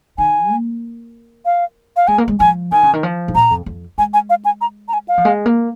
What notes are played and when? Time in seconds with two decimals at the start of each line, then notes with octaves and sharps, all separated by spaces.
0.18 D#3 G#5
0.50 A#3
1.45 F5
1.96 F5
2.08 G#3 G#5
2.18 A#3
2.28 G#3
2.40 F3 G#5
2.72 D#3 G#5
2.83 C#3
2.93 D#3
3.03 F3
3.28 G#2
3.35 A#2 A#5
3.51 F2
3.66 F2
3.98 G#3 G#5
4.14 G#5
4.30 F5
4.45 G#5
4.61 A#5
4.88 A#5
4.93 G#5
5.08 F5
5.18 F3
5.25 G#3
5.46 A#3